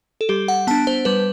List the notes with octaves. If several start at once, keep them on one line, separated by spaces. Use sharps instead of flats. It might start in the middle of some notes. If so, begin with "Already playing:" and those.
A4
G3 G4
F#5
B3 D4 A5
C5
G3 B4